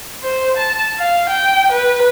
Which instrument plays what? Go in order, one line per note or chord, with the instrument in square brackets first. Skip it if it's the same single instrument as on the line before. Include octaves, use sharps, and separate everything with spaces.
[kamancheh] C5
A5
F5
G5
B4